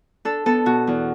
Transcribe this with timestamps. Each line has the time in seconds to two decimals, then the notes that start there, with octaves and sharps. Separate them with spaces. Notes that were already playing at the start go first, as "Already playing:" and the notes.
0.25 D4 A4
0.46 B3 A4
0.66 B2 F#4
0.87 E2